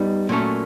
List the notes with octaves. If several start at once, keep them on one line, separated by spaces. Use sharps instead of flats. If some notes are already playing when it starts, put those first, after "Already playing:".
Already playing: G3 B3 D#4
A#2 F#3 A3 C#4